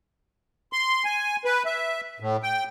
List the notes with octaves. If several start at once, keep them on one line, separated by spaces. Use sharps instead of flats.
C6
G#5
B4
E5
A2
G5